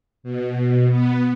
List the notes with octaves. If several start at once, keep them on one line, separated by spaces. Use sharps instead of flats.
B2
B3